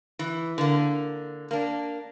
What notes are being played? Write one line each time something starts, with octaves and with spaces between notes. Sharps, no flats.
E3
D3 A#3
A#3 D4